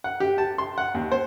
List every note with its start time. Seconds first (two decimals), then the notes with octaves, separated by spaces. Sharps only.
0.04 F#5
0.20 G4
0.38 A5
0.58 C6
0.78 F#5
0.95 D#2
1.12 C5